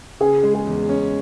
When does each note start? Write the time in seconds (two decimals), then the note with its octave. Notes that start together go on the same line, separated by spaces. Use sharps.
0.20 C#3 G#4
0.43 G#3
0.54 G#4
0.67 E2
0.89 C#4